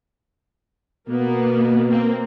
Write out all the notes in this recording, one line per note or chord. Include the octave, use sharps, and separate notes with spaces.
B2 A#3 B3
A#3 C4